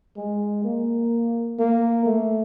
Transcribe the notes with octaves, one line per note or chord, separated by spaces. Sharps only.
G#3
A#3
A#3
A3